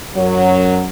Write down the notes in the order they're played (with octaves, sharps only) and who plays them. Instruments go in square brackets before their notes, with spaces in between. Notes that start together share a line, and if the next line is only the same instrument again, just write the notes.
[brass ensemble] F#2 F#3